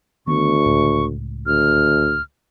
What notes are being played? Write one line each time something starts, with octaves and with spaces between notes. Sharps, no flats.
D2 D#3 B3 C#6
C#2 A2
D2 F6